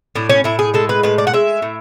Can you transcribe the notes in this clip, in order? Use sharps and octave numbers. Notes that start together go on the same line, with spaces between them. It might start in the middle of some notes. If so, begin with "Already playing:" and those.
A2 D4
C#4
A2 E4
G#4
G#3 A4
B4
A2 B4
D5
F#5
G#3 E5
A2